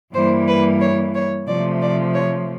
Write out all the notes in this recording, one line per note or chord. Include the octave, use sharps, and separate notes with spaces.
G2 E3 G3 A#3 C5
B4
C#5
C#5
C3 F3 A3 D5
D5
C#5